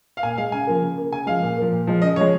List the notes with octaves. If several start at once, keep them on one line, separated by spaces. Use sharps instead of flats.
F5
A#2 G#5
G#3 F5
C#3 G#5
F3 A#3
C#3
A#3
C#3 G#5
F3 G#3 F5
A#2
F3 A#3
A#2
F3 G#3
C#3 D#5
F3 G#3 C#5